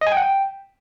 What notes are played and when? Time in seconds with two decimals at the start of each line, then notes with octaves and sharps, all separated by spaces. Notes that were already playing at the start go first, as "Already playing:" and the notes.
0.01 D#5
0.07 G#5
0.12 G5
0.17 F#5
0.22 G5